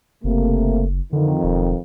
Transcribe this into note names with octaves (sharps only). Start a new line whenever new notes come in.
F#1 C3 A3 A#3
F2 D3 D#3
E1